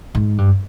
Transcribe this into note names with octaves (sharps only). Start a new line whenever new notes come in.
G#2
G2